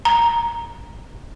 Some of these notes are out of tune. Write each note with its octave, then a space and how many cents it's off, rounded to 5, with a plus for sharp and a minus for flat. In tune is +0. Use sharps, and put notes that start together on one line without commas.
A#5 +5